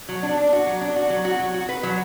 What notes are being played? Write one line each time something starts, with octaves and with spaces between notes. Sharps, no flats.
F#3
D4
D4
F#4
F#3
D4
F#4
F#3
F#4
F#3
F#4
B4
F#3